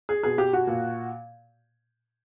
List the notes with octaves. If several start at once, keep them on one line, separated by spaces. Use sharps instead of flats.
G#4
B2 G#4
G4
F#4
A#2